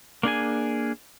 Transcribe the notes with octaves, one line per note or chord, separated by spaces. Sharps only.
A#3 D4 G#4 G#5